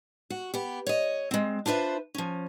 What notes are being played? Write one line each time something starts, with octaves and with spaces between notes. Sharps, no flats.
F#4
B3 G4
C#5 D#5
G#3 C4
D4 F4 B4 C5 E5
F3 C#4